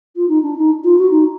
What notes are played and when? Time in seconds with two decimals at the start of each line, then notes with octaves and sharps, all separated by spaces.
0.16 F4
0.29 D#4
0.43 D4
0.57 D#4
0.84 F4
0.98 F#4
1.11 D#4